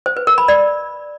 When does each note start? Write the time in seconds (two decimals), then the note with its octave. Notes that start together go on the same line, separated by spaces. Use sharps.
0.06 C5
0.17 B4
0.27 A#4
0.38 B5
0.48 D5